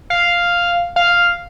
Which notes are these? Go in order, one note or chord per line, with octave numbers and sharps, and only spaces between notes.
F5
F5